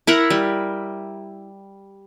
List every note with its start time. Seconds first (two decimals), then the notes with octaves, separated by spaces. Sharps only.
0.07 E4 A#4 F#5
0.30 G3